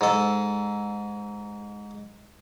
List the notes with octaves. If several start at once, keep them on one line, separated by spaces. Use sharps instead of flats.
G#2 A4